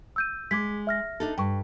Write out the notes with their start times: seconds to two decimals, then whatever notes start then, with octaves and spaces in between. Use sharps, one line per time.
0.16 E6 G6 D#7
0.51 G#3 D6 G#6 B6
0.87 E5 F6 A#6
1.20 D4 D#4 A4
1.38 G2 G5 C#6